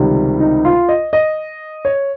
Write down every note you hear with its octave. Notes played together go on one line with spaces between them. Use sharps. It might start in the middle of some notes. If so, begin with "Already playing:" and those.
Already playing: C#2 C3 D#3 G3
D#4
F4
D#5
D#5
C#5